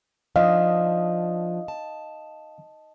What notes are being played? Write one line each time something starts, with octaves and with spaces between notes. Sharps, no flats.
F3 D4 D#5 F5
A5